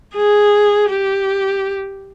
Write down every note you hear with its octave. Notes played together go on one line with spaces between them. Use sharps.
G#4
G4